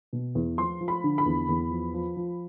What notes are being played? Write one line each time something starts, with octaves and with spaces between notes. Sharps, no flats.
B2
E2
F3 C6
F3
B5
D3
B5
E2
E2
F3
F3
F3